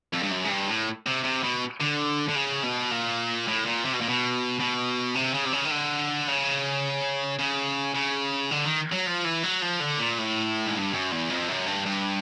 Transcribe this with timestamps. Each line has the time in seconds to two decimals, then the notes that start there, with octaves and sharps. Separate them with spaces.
0.13 F2
0.23 G2
0.31 F#2
0.45 G#2
0.50 G2
0.68 A2
1.06 C3
1.24 C3
1.44 B2
1.81 D3
2.29 D3
2.36 C#3
2.63 B2
2.91 A#2
3.48 A2
3.66 A#2
3.85 C3
3.93 B2
4.01 A#2
4.09 B2
4.60 B2
5.15 C3
5.34 C#3
5.46 C3
5.53 C#3
5.65 D#3
5.71 D3
6.28 C#3
7.39 C#3
7.95 C#3
8.51 D3
8.65 D#3
8.92 F#3
9.06 F3
9.24 E3
9.43 F#3
9.62 F3
9.80 D3
9.99 A#2
10.19 A2
10.66 G#2
10.74 G2
10.93 F#2
11.12 E2
11.30 F2
11.48 F#2
11.66 G2
11.86 G2